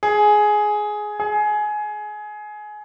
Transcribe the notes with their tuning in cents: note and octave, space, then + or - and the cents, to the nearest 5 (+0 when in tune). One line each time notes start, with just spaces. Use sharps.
G#4 +10
G#4 +20